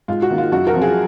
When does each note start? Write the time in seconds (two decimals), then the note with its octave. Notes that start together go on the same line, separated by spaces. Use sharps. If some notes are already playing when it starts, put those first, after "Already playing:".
0.08 G#2 F4
0.22 F#4
0.30 D#3 A#3
0.38 F4
0.52 F#2 F#4
0.67 F#4 A#4
0.74 F3 C4
0.81 F4 G#4